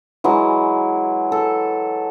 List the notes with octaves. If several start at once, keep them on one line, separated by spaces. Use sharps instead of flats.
E3 F#3 G#3
A4